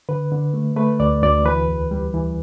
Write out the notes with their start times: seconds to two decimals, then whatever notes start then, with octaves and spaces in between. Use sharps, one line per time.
0.09 D3 B4
0.32 D3
0.54 A3
0.76 A3 B4
1.00 D2 D5
1.22 D2 D5
1.45 E3 B4
1.68 E2
1.91 G3
2.14 E3